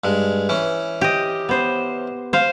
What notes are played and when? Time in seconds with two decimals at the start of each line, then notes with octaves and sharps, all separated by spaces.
0.04 G2 G#3
0.49 E3 C#4
1.01 G4 D#5
1.49 B3 C5
2.33 C5 F5